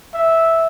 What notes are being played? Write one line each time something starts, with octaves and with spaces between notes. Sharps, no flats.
E5